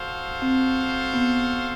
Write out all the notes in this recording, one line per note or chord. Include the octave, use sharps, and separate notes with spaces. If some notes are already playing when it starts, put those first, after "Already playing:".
Already playing: F#4 A4 C5 F5
C4
B3